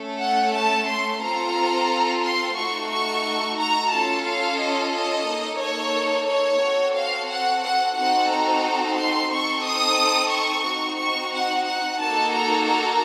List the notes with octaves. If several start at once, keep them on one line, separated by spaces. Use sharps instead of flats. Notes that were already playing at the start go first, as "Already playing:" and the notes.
Already playing: A3 C#4 A4
F#5
A5
C6
C4 F4 A4 A#5
C6
A3 D#4 F#4 A4 C#6
C#6
A#5
C#4 F4 A4 A5
F5
D#5
D#5
A#3 D#4 A4
C#5
C#5
C4 F#4 A4
F5
F#5
F#5
C4 D#4 F#4 A4 F#5
A#5
C6
C4 D#4 A4 C#6
D#6
C#6
C4 D#4 F#4
C#6
F#5
F#5
A#3 D#4 F#4 A4 A5
A#5
A#5